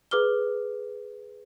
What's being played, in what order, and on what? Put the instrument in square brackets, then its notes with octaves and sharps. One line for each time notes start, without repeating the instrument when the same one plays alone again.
[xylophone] G#4 B4 D6 F6 G7